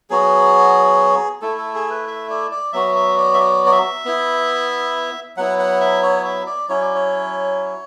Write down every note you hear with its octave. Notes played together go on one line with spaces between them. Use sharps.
F#3 B3 F#4 G#4
A3 E4 A4
A4
G#4
B4
E5
D5
D5
F#3 B3 F#4 E5
E5
D5
E5
D5
D5
E5
B3 E4
F#3 B3 E4 F#5
F#5
E5
C#5
E5
D5
F#3 C#4 E4 C#5
D5
C#5